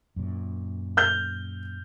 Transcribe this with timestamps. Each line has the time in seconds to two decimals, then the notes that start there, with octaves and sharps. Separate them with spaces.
0.16 F#2 A#2
0.97 F6 G6